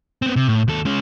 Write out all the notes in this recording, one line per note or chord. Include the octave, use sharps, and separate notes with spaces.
B3 C4
C3
A2
D#2 A4
G#3 C#4